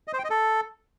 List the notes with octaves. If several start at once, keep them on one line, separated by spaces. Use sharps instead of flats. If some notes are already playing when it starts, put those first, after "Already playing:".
D#5
C5
G5
D#5
A4